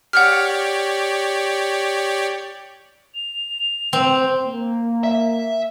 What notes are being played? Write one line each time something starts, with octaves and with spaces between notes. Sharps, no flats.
G4 C#5 D5 F#5 F6
F7
C4
A#3
E5